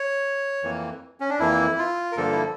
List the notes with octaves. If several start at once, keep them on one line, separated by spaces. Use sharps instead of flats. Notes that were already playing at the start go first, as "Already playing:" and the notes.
Already playing: C#5
F2 E3 A#3
C#4
D4
F2 E3 A#3 E4
F4
A#4
G2 D3 F3 A#3 A4
E4